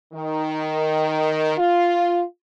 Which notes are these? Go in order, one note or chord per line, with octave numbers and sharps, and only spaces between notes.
D#3
F4